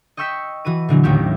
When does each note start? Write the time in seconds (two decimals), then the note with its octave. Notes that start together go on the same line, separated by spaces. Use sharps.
0.17 D#5 G5 C#6 E6 G6 B6
0.65 E3 F#4 B4 D#7
0.89 A#2 D3 E3 F#3
1.03 A1 D#2 A3 G4 E5